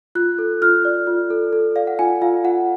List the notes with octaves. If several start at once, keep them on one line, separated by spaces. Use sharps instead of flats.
F4 F#6
A4
F4 F6
D5
F4
A4
A4
D5 F5
F#5
F4 G#5
F4 F5
F4 F#5